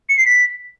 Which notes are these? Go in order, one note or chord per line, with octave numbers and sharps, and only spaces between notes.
C#7
C7
B6